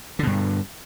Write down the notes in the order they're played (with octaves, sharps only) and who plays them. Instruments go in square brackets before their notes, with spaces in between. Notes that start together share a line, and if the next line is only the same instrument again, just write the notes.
[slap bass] D3
B2
G2